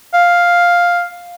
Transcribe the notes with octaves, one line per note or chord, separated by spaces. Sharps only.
F5